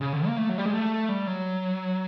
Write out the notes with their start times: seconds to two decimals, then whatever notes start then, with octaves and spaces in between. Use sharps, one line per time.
0.01 C#3
0.13 D3
0.27 A#3
0.38 A3
0.49 F#3
0.58 G3
0.66 G#3
0.73 A3
1.09 G3
1.27 F#3